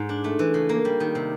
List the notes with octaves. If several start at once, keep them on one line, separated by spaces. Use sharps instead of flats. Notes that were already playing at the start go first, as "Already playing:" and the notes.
Already playing: G#2
D4
A3
E3
C#3
A#3
G3
D#3
C3